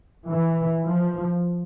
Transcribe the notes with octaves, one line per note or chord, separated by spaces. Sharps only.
E3
F3